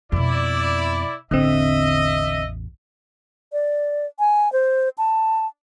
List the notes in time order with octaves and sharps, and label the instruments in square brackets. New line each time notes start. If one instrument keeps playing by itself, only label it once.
[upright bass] F2 B2 [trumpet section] E4 D5
[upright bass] A1 E2 [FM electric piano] D3 C4 [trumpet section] D#5 E5
[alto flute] D5
G#5
C5
A5